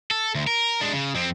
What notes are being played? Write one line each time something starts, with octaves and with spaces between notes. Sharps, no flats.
A4
D2
A#4
G#3 D4
C#3
F2 C4